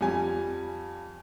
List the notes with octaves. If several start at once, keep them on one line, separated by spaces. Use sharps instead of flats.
F2 G3 G#5